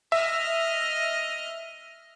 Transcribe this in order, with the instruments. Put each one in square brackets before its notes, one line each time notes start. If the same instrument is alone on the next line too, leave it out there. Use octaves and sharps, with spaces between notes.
[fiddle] D#5 F6 [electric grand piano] E5